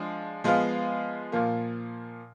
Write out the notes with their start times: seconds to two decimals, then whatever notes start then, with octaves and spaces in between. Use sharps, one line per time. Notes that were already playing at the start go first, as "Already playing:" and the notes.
Already playing: F3 G#3 D4
0.44 F3 G#3 B3 F4
1.32 A#2 F3 A#3